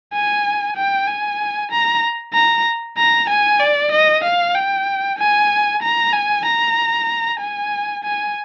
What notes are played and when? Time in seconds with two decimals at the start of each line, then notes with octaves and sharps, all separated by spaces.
0.13 G#5
0.76 G5
1.07 G#5
1.71 A#5
2.33 A#5
2.97 A#5
3.29 G#5
3.60 D5
3.92 D#5
4.24 F5
4.55 G5
5.18 G#5
5.82 A#5
6.13 G#5
6.46 A#5
7.40 G#5
8.04 G#5